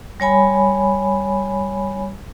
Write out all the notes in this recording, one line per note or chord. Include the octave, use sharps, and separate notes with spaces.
G3 C#5 G#5 B5